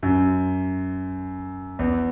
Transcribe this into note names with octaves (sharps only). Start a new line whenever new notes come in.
F#2
E2